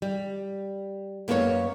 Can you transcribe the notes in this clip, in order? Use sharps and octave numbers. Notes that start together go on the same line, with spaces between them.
G3
F#2 A#3 B3 A4 C#5